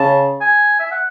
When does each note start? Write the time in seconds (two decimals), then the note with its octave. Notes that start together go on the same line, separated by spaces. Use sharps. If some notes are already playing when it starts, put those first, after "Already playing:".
Already playing: C#3 A5
0.41 G#5
0.80 E5
0.91 F#5